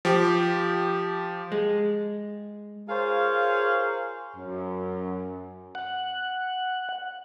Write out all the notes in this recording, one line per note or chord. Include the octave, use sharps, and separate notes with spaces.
F3 G4
G#3
F4 G#4 A#4 C5 C#5 F5
F#2
F#5